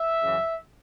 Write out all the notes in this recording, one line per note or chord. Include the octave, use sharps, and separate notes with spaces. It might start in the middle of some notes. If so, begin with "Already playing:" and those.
Already playing: E5
F#2 C#3 E3